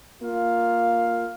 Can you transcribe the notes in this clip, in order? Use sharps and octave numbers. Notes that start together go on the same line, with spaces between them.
A#3 F4 F5